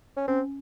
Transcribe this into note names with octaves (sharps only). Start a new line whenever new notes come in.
C#4
C4 C#4